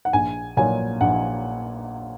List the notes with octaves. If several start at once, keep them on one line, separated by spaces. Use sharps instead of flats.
F#5
A#1 G#5
A#2 F#3 G#5
A#1 F#5